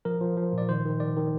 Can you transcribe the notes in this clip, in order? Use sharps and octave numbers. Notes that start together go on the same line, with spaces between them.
F3 A#4
F3
F3
A#2 D5
D#3 C5
D#3
D#3 D5
D#3